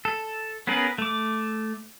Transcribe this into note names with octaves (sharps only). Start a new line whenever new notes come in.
A4
B3 C#4 G#4 A#4 B4
A3 D6